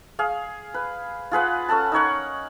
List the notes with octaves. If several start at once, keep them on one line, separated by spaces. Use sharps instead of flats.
G#4 F5
B4
F4 G#4 B4 F#5
C#4 A4 F#5 A5
D#4 A#4 C#5 F#5